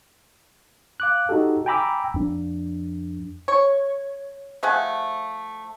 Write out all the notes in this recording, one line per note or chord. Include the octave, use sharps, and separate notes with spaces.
F5 D6 F#6
D#4 F#4 G4 A4
G5 G#5 A#5 B5 D6 E6
F2 D4
C#5
F3 A3 G#4 F#5